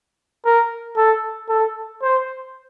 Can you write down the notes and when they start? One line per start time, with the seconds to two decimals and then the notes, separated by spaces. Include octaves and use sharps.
0.45 A#4
0.97 A4
1.49 A4
2.02 C5